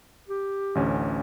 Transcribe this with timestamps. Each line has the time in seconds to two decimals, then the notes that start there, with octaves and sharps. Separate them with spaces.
0.28 G4
0.75 A1 D2 C#4